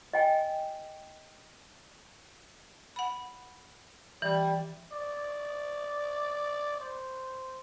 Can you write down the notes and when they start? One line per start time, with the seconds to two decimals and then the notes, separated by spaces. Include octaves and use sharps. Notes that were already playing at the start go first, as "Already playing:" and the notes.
0.13 D#5 G5 G#5
2.96 F#5 B5
4.22 E3 G3
4.93 D5
6.80 C5